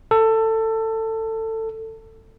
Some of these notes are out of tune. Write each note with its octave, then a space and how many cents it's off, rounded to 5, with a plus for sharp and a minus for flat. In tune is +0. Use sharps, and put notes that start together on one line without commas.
A4 +20